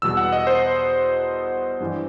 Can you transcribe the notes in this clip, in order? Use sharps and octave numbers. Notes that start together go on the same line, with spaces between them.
E2 B2 G3 B3 E6
F#5
D#5
C5
G2 E3 G3